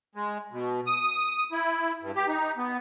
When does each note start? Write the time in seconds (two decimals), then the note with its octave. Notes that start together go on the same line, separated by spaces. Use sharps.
0.15 G#3
0.52 B2
0.87 D#6
1.52 E4
2.02 G2
2.16 G4
2.28 D#4
2.57 B3